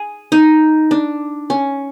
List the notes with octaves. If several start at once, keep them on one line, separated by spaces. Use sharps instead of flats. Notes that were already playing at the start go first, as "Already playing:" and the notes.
Already playing: G#4
D#4
D4
C#4